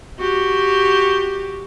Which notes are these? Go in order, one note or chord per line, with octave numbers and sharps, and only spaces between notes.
F#4 G4